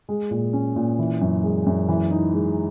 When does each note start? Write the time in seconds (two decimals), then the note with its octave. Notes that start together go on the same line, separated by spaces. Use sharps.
0.09 G#3
0.31 A#2
0.53 C#4
0.76 A#2
0.99 E3
1.21 F#2
1.43 G#3
1.66 F#2
1.89 E3
2.11 D#4
2.33 G#3